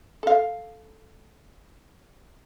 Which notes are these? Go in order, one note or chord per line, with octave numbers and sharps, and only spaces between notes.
A4 F5